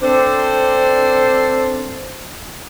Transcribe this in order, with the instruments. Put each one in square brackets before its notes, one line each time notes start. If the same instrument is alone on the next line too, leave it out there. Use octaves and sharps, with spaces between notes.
[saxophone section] C4 D4 A4 C5